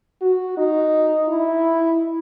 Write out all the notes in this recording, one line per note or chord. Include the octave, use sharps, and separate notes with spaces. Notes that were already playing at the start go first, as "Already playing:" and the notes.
F#4
D#4
E4